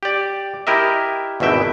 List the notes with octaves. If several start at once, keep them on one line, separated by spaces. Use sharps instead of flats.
G4 D5
E4 G4 A#4 D#5 E5
G#1 E2 B2 E5 G5